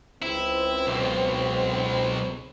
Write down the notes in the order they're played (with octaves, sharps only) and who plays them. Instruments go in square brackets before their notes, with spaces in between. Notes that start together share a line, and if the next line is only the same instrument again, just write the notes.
[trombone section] C#2 C4 [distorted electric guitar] E4
[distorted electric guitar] B1 B2